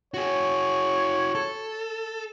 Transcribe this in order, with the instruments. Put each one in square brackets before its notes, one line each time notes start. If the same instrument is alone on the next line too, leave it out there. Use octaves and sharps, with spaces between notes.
[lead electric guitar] F#4 G#4 [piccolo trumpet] C#5
[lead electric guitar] A4